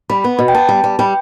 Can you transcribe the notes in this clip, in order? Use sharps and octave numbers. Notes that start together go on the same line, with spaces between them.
G3 B5
B3
B2
G5
B3 A5
G3
G3
G3 G5